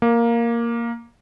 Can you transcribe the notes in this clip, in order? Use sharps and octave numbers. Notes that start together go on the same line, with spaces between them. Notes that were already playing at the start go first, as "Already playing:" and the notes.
A#3